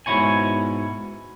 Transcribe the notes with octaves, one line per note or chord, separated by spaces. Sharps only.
G#2 B2 F#3 E4 C#5 G#5